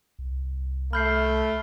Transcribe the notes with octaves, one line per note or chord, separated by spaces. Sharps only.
C2
A3 B5 F6 G6 C7